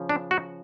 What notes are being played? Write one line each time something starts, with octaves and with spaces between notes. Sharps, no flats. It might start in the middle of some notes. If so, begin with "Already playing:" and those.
Already playing: C#3 F3
D4
F#4